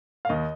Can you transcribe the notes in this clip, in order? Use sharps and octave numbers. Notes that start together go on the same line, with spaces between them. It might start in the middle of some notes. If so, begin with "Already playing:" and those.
F5
D#2 D#5